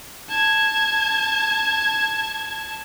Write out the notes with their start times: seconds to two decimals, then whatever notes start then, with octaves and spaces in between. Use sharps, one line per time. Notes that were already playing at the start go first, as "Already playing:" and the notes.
0.30 A5 G#6